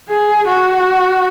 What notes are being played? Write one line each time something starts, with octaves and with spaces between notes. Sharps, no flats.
G#4
F#4